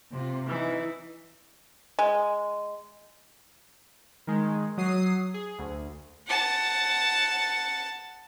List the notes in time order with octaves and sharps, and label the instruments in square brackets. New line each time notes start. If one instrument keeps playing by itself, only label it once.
[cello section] C3 F4
[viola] E3 [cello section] D#4
[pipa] G#3
[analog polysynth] D#3 G#3
F#3 D#6 C7
G#4
D2
[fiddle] F#5 A5